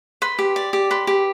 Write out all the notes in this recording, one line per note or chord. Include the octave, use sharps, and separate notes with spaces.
B4 C6
G4
D5
G4
B4 C6
G4